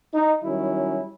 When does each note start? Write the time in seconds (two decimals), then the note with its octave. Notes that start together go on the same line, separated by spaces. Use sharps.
0.15 D#4
0.44 D#3 F#3 G3 C#4 E4